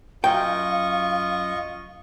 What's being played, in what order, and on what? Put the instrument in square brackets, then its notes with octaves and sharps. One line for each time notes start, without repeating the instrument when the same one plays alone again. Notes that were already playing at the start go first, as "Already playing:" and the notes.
[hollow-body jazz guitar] F#2 G5 [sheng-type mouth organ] F4 D#5 C#6 [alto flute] F5